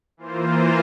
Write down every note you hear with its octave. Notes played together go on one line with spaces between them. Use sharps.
E3 A#3 F4 C5